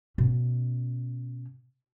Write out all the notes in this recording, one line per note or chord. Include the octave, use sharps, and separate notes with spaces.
B2 C#4